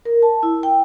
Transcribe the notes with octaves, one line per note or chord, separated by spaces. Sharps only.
A#4
A5
E4
G5